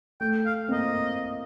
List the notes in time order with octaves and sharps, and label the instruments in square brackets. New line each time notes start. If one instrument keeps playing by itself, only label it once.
[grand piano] A3 [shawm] G5
[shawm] F5
[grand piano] C4
[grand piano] A#3 [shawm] D#5